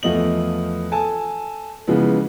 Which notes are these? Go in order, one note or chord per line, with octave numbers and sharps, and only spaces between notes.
E2 F3 A3 D#5 F#7
A4 G#5 A5
C#3 E3 F3 G#3 B3